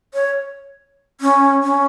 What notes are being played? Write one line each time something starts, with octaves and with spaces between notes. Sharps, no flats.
C#5
C#4
C#4